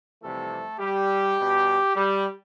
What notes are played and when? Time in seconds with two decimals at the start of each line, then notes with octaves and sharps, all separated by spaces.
0.22 F2 C3 E3 G3 A3 A4
0.79 G3 G4
1.37 B2 G3
1.95 G3 G4